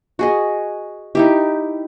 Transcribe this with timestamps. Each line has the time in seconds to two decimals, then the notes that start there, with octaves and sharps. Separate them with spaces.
0.19 F#4 G#4 D#5
1.15 D#4 E4 G4